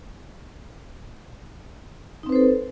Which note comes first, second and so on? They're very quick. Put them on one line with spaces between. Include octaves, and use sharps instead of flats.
D#4 C4 B4 C5 A4